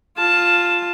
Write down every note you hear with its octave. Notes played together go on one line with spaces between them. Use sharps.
F4 A5